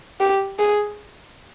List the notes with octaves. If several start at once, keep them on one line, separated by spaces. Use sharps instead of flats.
G4
G#4